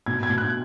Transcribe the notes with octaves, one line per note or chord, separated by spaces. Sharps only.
B2 G#6
G#6
B2
F#6